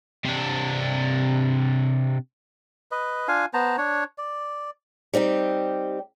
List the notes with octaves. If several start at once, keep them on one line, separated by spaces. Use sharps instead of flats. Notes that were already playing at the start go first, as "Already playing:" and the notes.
C3 D4
B4 D#5
D4 F4 F5 G#5
B3 C5 A5 A#5
D4 C#5
D5
G3 C4 D#4 G4